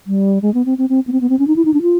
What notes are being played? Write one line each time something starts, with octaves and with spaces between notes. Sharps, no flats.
G3
G#3
B3
C4
C4
C4
B3
C4
B3
C4
C#4
D#4
E4
D#4
D4
F4